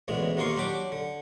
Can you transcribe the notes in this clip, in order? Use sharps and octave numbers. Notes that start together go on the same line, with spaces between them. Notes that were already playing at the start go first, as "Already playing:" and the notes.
A1 D2 B2 G#3
D#2 D#3 A#3 F4 C6 C#6
F#3 D4 G4 D6
D3